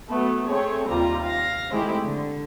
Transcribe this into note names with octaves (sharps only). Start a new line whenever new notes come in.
F#3 A3 B3
A3 C4 G#4 C#5
D#2 C3 G3 F4 A#5
F5 A#6
D#3 G#3 A3 C4 E4 G4
D3